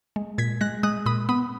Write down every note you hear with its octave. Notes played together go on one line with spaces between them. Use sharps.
G#3
A#2 G#6 B6
G#3 F#6 A#6
G#3 D#6 F#6
A#2 B5 D#6
B3 B5 D#6